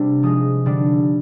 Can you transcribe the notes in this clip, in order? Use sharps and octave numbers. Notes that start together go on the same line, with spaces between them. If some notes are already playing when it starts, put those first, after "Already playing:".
Already playing: C3 G3 C4 D4
F3 G#3 D#4 D#6
D3 G3 D4